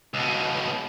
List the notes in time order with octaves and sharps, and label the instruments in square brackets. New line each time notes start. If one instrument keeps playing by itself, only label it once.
[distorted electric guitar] C#2 B2